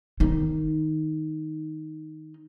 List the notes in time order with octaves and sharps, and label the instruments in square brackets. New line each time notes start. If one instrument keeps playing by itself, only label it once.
[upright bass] D#3 D#4